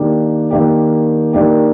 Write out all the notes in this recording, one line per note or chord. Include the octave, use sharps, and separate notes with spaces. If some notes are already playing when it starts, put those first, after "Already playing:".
Already playing: D#3 A#3 D4 G4
D#3 A#3 D4 G4
D#3 A#3 D4 G4